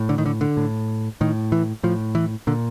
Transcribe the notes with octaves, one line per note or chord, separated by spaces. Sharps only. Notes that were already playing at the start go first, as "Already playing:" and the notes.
Already playing: A2
D3
D#3
D3
D3
A2
A2 D#3
E3
A2 F3
E3
A#2 D3